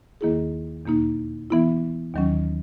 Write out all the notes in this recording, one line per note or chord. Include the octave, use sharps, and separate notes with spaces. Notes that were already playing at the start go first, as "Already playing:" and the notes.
D#2 D#3 A#3 E4 G#4
E2 B2 A#3 D#4
E3 B3 E4
D#2 D#3 F#3 C#4